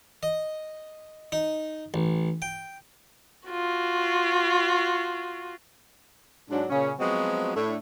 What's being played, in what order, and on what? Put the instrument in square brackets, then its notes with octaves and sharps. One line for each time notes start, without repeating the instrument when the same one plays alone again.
[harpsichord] D#5
D#4
A1
G5
[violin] F4 F#4
[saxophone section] G#2 F#3 D4
A#2 C#3 C#4
F3 F#3 G#3 B3 C4 F#4
A2 A3 D4